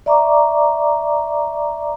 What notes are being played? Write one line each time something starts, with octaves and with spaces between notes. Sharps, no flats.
D5 E5 A#5 C#6 D6